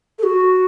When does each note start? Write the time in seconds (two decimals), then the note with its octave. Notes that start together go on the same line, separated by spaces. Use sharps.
0.19 A4
0.23 F#4